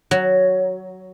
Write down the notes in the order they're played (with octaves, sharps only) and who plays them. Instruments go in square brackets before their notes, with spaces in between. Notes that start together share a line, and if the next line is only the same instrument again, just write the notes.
[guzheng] F#3